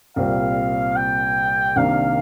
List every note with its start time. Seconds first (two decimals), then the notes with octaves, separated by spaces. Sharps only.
0.16 C2 A#2 G3 C4 F5
0.96 G5
1.76 C2 C3 D#3 A#3 D4 F5